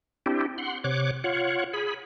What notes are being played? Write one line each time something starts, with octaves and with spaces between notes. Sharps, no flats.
C4 D4 E4 G4
F#5 C6
C3 C#5 D6 F#6
F4 C#5 F#5
G#4 B5